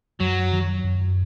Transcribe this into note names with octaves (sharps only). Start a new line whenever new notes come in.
F#2 F#3
D#3
F#2